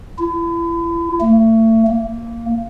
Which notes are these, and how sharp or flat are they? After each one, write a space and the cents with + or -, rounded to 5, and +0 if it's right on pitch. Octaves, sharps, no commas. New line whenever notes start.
E4 +35
A3 +30
A#3 -10